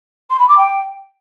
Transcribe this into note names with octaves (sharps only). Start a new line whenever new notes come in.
C6
B5
D6
G5